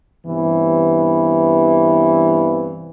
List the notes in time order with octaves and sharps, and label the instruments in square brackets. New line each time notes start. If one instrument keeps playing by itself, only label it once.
[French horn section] G2 C3 E3 B3